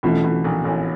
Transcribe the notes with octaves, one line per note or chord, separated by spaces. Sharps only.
B1 B2 E3 A3 C#4 F4
B1 B2
A#1 A#2
A1 A2